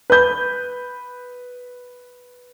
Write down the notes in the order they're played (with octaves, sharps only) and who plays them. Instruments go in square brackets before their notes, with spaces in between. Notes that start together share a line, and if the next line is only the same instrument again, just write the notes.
[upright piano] B4 G6